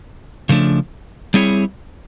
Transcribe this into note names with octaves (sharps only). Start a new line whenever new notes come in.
C#3 F3 A3 D4
G3 C4 E4 G#4 C#5